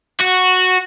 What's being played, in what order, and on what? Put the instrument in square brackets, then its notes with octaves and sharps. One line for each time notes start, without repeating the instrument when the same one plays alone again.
[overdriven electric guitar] F#4